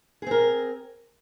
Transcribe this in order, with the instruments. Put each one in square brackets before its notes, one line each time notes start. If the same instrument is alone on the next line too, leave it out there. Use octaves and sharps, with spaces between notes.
[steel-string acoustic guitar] G#4
C4
A#4